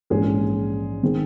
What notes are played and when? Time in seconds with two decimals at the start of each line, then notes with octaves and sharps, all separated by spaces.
0.10 A#1 G#2 E3 G#3 C#4 G#4
1.03 D#3 G#3 C4